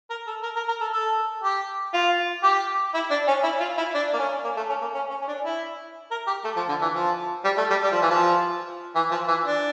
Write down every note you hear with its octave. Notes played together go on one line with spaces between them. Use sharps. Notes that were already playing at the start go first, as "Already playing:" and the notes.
A#4
A4
A#4
A#4
A#4
A4
A4
G4
F4
G4
E4
D4
C#4
E4
F4
E4
D4
A#3
C#4
A#3
A3
C#4
A#3
C#4
C#4
C#4
D4
E4
A#4
G4
A3
F3
D3
E3
F3
G3
A3
G3
G3
F3
E3
F3
E3
F3
E3
D4